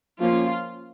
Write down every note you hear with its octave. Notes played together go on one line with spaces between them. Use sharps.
F3 A#3 C#4 F4